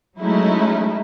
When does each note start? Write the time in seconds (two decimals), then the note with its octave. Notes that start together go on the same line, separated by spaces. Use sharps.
0.19 F#3 G#3 A3 C#4 D#4 E4